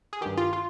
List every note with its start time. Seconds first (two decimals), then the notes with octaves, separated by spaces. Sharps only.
0.13 G#4
0.21 G2 D#3 G4
0.38 F4
0.53 F4